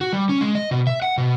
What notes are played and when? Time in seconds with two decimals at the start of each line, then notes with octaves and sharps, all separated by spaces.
0.01 F#4
0.13 G3
0.29 C#4
0.41 G#3
0.55 D#5
0.71 B2
0.87 E5
1.02 F#5
1.18 B2